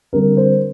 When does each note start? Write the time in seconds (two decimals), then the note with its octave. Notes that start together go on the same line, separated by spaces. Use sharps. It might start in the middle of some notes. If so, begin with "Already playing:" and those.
0.13 D3 G3 C4 A#4
0.37 C5